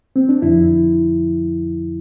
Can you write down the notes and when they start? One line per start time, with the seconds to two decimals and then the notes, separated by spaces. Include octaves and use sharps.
0.16 C4
0.29 D4
0.42 F2 D3 F3 E4